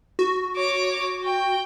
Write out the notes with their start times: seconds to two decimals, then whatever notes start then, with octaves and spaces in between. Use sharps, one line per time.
0.19 F#4
0.56 C#5 D6
1.24 G5